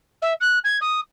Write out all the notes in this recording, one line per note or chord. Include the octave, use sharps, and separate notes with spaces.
E5
F#6
G#6
D#6